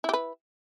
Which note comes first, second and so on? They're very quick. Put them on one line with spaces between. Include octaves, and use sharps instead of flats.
E4 G4 B4